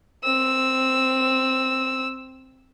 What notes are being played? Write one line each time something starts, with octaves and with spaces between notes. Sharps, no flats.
C4 E6